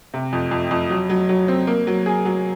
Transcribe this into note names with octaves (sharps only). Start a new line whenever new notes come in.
C3
F2
F2
F2
F#3
F#3
F#3
C4
A#3
F#3
G#4
F#3